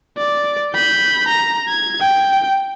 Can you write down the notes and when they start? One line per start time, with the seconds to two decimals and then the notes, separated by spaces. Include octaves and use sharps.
0.18 D5
0.75 B5 G6
1.28 A#5
1.68 G#6
2.01 G5